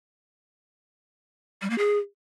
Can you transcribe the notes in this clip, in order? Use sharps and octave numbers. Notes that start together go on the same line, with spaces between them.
G3
A#3
G#4